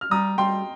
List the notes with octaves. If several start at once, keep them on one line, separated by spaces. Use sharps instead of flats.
F6
G3 A#5 D#6
G3 G5 C6